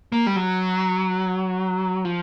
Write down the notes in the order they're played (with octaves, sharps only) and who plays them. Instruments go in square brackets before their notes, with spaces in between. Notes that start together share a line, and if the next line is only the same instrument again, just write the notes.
[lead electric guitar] A#3
G3
F#3
F3